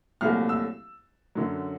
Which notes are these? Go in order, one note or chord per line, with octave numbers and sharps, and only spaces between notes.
C2 A#2 F#3 A3 F6
E6
F#2 D3 F#3